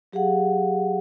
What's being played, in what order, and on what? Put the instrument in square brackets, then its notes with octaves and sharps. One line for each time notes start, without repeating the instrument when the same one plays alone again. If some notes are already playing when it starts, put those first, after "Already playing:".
[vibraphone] F#3 G4 G#4 F5 F#5